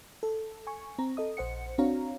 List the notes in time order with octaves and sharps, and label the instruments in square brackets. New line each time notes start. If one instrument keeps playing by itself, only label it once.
[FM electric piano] A4
G#5 C#6
C4 A#5
A4 D#5 D#6
A#1 C5 F#5 C#7
C4 D4 F#4 C#5 F5 A#5